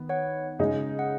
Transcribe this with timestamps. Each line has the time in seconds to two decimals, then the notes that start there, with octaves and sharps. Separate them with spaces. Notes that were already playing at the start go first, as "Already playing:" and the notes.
Already playing: D#3 B3
0.09 C#5 F#5
0.59 C#3 G#3 D#4 G#4
0.99 F#5